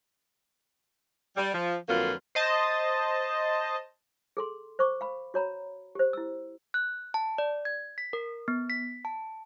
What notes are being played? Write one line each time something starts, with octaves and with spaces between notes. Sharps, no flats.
G3
F3
F2 D3 F#3 A#3 F4 B4
C5 D#5 A5
G#4 A4 C6
C5 C#6 D6
F5 B5
F#4 C#5 A#5 B5
G4 C5
E4 E6
F#6
A5
D5
G#6
B6
A#4
B3
B6
A5